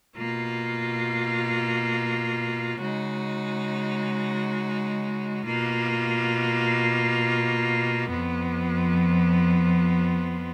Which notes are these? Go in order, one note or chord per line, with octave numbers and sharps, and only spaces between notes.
B2 A#3 F4
C#3 G#3 D#4 F#4
B2 A#3 F4
F2 F3 B3